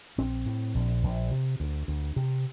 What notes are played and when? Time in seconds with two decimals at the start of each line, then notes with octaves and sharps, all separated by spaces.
0.18 A#1 C4
0.46 A2
0.75 A#1
1.03 A#1
1.31 C3
1.60 D2
1.88 D2
2.16 C3